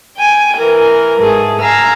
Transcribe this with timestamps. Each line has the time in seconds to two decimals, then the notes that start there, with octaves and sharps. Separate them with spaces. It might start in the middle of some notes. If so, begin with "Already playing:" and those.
0.17 G5 G#5
0.56 E3 A#4
1.18 G#2 A3 G#4
1.61 F5 G#5 A#5 E6